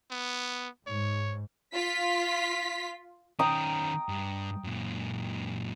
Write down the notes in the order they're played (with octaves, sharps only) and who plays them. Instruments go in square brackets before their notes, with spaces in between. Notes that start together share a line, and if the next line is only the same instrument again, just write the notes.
[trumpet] B3
[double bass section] G#2 [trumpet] C#5
[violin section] F4 B6
[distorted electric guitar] D#3 C#4 [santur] G5 A#5 D#6
[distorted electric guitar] G2
F#2 A#2